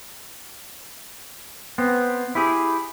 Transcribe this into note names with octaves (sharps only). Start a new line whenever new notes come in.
B3 C4
E4 G4 G#4